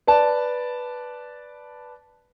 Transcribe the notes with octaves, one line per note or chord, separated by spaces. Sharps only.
B4 D5 A5